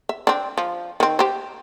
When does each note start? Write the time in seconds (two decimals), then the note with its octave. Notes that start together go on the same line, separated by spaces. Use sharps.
0.09 E5
0.27 C4 D4
0.58 F3
1.00 D#3 C4
1.19 G4 C5